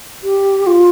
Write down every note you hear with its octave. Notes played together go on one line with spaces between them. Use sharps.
G4
F4